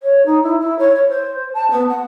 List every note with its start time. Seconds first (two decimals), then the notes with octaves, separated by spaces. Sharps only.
0.02 C#5
0.25 D#4
0.43 E4
0.59 E4
0.78 C#5
0.94 C#5
1.08 C5
1.54 A5
1.70 B3
1.88 F#5